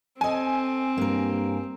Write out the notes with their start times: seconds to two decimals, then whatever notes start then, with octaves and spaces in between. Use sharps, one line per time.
0.21 C4 A4 D#5 G#5
0.98 G2 A#3 A#4